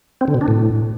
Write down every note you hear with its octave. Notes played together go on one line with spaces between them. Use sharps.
C4
D3
B2
D4
A2